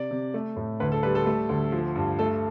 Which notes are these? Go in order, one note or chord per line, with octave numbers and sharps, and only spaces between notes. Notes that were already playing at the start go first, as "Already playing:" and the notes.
Already playing: C3 D5
C3
A3
A2
D2 B4
A4
G3 B4
A4
A3
D2
F3
G2
A3 A4